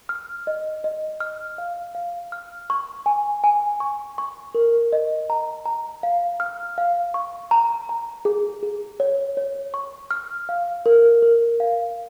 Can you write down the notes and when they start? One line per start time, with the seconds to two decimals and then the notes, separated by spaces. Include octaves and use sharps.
0.09 F6
0.47 D#5
0.84 D#5
1.20 F6
1.58 F5
1.95 F5
2.32 F6
2.70 C#6
3.06 G#5
3.44 G#5
3.80 C#6
4.18 C#6
4.55 A#4
4.93 D#5
5.30 A#5
5.66 A#5
6.03 F5
6.40 F6
6.78 F5
7.14 C#6
7.51 A#5
7.89 A#5
8.25 G#4
8.63 G#4
9.00 C#5
9.37 C#5
9.74 C#6
10.11 F6
10.49 F5
10.86 A#4
11.22 A#4
11.60 F5